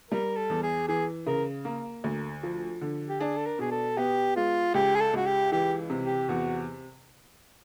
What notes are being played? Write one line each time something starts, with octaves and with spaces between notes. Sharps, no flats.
G3 A#4
A4
E2
G#4
E3 G#4
C#3 A#4
A#3
D2
F3
D3
G4
D4 G#4
A4
A#4
B2 G#4
A4
B3 G4
G#3 F4
C#2 G4
G#4
A4
C#2 F#4
G4
E3 G4
C3
G4
E2 F#4